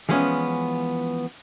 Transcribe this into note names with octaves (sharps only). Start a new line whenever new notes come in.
E3 F3 G#3 B3 C#4